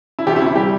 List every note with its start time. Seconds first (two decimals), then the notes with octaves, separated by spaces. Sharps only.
0.19 E4
0.27 D2 G4
0.36 E4
0.41 C3
0.46 E4
0.56 G3 G4